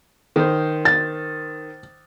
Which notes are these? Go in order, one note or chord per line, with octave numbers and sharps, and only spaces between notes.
D#3 C5
A6